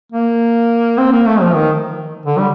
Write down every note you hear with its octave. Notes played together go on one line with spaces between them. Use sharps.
A#3
C4
A#3
A3
F3
D#3
D3
G3